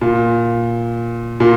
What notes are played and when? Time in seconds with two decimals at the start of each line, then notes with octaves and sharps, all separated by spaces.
0.01 A#2
1.40 A#2